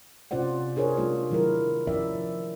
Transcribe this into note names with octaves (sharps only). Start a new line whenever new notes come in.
C3 C#4 F4 C5 D5 F#5
D4 G#4 A#4 C5 C#5
G3 A3 C#4 D#4 F4 G#4
D#3 F#3 A3 E4 A#4
F3 C#4 E4 A#4 D5 E5